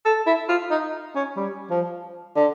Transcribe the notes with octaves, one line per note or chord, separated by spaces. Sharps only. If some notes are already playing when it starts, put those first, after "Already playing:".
A4
E4
F4
D#4
C#4
G3
F3
D3